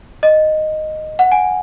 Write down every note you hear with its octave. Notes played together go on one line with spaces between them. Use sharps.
D#5
F#5
G#5